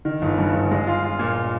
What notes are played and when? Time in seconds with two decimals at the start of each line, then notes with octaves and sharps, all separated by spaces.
0.05 D#3
0.22 G1
0.38 G2
0.54 G1
0.71 G#3
0.87 F4
1.04 F4
1.19 A#2